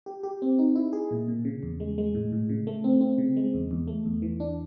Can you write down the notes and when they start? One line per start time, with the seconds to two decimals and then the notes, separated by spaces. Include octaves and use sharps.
0.06 G4
0.23 G4
0.42 C4
0.59 D#4
0.75 E4
0.93 G#4
1.11 A#2
1.28 A#2
1.45 C#3
1.63 E2
1.80 G#3
1.98 G#3
2.15 A2
2.32 A2
2.49 C#3
2.67 A3
2.84 C4
3.01 C4
3.18 C#3
3.37 G#3
3.54 E2
3.71 E2
3.88 A3
4.05 E2
4.22 E3
4.40 D4